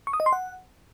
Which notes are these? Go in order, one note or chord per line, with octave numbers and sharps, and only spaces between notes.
C#6
D#6
D#5
C6
F#5